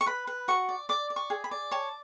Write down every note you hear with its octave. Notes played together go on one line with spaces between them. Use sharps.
C#6
B4 B5
B4
F#4 C#6
D5
D5 D6
D5
C#6
G#4
B5
D5
C#5 A5